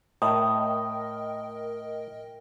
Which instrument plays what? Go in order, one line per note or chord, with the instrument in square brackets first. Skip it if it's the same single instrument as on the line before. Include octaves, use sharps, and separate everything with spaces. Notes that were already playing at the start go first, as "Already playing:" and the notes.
[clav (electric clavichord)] A2 [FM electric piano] A#4 D#5 G5 [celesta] D#6